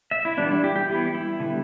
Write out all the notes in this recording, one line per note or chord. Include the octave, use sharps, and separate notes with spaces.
E5
E4
E3 G3 B3 D4
E4
G4
G4
E3 G3 B3 E4
E4
D3 G3 B3